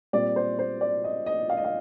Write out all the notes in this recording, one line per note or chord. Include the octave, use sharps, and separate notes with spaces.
A#2 G3 C4 D5
C5
C5
D5
D#5
D#5
F5
D#5
F5